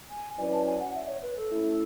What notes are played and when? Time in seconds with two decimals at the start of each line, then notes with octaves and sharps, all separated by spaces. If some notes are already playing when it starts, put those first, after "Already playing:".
0.10 G#5
0.38 F#3 C#4 E4 B4 D5 G#5
0.52 A5
0.66 G#5
0.80 F#5
0.95 E5
1.08 C#5
1.23 B4
1.37 A4
1.50 A3 C#4 E4